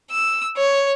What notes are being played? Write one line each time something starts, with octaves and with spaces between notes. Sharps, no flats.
E6
C#5